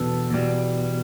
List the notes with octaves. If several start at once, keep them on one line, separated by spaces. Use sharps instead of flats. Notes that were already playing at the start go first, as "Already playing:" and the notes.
Already playing: E2 B2 B3 D4 A4
E2 B2 G3